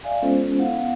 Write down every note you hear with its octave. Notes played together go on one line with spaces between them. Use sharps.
D5 E5 F5 G#5
G#3 B3 C#4 F4 A4 C5
B3 E4 F5 F#5